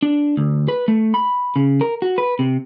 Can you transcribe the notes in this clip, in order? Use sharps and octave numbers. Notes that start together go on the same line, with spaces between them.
D4
D2
B4
A3
B5
C#3
A#4
F#4
B4
C3